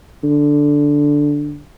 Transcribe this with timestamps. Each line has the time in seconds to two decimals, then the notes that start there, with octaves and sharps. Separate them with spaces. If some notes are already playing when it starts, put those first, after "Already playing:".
0.24 D3